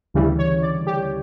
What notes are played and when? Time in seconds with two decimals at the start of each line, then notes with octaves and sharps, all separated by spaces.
0.14 D2 C#3 E3 G3
0.39 C#5
0.62 D5
0.87 G4